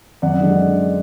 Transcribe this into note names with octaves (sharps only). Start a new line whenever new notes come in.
F#2 D5 F#5
D3 G#3